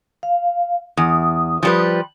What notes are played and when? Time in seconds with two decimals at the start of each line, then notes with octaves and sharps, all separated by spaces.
0.23 F5
0.97 E2 D#6
1.63 F3 G3 B4